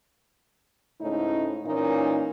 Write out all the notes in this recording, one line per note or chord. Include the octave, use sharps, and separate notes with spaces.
G#2 C#3 A3 C#4 D#4 E4
A#2 E3 A#3 C#4 D#4